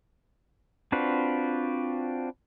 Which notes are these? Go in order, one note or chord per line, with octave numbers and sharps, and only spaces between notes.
C4 D4 F4 F#4 B4